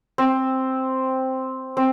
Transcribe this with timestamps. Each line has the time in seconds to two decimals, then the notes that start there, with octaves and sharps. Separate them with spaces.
0.18 C4
1.77 C4